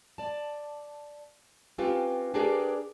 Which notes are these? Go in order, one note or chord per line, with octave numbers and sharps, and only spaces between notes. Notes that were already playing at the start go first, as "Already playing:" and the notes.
D5 A5
C4 C#4 F4 G4 B4
D4 G4 G#4 A#4 B4 D5